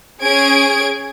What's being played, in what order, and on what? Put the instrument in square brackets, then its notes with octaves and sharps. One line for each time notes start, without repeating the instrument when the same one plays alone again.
[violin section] C#4 G#4 G#6 D7